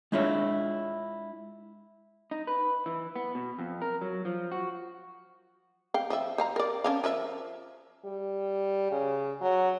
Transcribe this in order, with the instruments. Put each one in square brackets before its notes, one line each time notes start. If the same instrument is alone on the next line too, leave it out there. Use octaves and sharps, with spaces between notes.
[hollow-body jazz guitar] G#3 D4 E4 F4 C#5 E5
[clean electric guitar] D#4
B4
E3
B3
B2
F2
A#4
F#3
F3
F#4
[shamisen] F5 G5
F3 E5
C5 F5 A#5
A#4 D5
C#4 D4 F5
F3 A#4 E5
[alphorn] G3
C#3
F#3